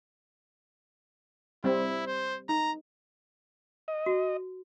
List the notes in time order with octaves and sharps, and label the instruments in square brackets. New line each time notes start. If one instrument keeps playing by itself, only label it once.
[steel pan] G3 C4 [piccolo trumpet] E4
[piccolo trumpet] C5
[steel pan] D#4 [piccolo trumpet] A#5
[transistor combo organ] D#5
[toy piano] F#4